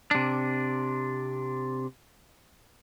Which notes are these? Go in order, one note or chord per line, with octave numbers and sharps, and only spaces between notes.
C3 D4